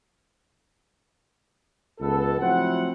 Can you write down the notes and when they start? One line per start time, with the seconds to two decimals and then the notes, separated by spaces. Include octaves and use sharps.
2.00 C#2 B3 A4
2.39 A2 F3 F#3 C4 E4 F#5